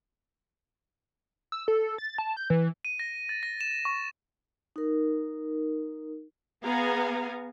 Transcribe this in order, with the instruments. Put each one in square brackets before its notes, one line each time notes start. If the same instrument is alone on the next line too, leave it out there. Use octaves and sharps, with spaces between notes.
[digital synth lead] E6
A4
A6
A5
G6
E3
[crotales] D#7
A#6
A6
A#6
E7
C#6
[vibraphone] D#4 A#4
[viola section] B3 G#4 F5 G#5 A#5